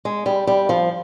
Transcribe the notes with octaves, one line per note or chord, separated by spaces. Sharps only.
G#3
G3
G3
F3